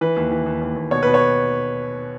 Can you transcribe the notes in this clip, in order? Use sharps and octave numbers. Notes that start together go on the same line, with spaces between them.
E3 B4
D#2
E3
D#2
D#2
D#2
B2 C#5
B2 B4
C#5